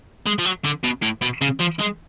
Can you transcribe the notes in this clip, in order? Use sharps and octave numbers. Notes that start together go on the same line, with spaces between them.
G#3
F3
F#3
D3
B2
A2
B2
C#3
F3
G#3